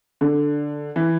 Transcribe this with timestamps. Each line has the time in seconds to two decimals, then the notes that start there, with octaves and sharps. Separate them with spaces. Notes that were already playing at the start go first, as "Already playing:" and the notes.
0.21 D3
0.96 E3